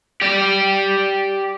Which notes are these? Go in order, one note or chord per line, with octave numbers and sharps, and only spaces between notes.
G4 D5